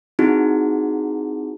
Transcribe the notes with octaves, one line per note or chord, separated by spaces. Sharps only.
C4 D#4 E4 F#4 G#4